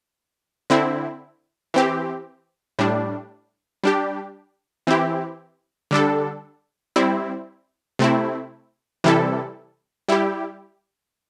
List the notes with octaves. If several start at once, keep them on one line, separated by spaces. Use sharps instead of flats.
D3 C4 E4
E3 C4 G4
A2 G3 D4
G3 D4 G4
E3 C4 E4 G4
D3 G3 D4 A4
G3 C4 E4
C3 A3 C4 E4
C3 E3 G3 E4 A4
G3 E4 G4